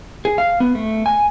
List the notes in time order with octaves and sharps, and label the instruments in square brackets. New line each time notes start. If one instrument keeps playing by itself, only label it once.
[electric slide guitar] G#4
F5
B3
A3
G#5